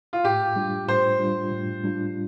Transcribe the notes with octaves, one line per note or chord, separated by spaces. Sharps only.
F4
A2 G4
G3 D4 F4
A2 C5
G3 D4 F4
A2
G3 D4 F4